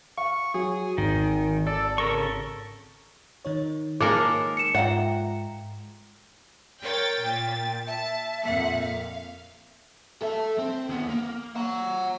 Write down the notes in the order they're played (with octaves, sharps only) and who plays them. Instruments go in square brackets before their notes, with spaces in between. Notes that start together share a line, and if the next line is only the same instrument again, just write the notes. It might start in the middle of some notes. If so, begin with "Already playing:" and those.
[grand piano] F5 [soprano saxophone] C#6
[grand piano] F#3 [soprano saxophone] G#4
[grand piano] G#1 [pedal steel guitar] D#3
[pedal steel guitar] A4 [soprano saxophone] D5
[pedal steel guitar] C#3 A4 C#6 [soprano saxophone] A#4
[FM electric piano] D#3 D#4 C#5
[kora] G#3 A4 A#4 [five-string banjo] A#3 [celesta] D6
[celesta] C#7 E7
[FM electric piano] G#2 F4 A#5 [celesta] E5 G5 [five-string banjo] F#5
[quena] A#4 [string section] C#5 G5 A6
[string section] A#2 A6 [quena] G5
[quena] E5 [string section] A5
[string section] F2 A#2 F#5
F5
[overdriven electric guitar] A4 E5
C4
D#2 B3
A#3
F#5 A#5